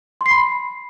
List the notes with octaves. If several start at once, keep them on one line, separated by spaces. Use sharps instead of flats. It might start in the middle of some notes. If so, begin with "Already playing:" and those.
C6
C7
B5